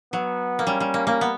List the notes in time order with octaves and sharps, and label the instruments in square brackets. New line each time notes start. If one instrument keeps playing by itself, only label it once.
[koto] F#3 [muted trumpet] B3
[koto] A#3
[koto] G3 [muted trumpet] C#4
[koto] G3
A#3
A#3
B3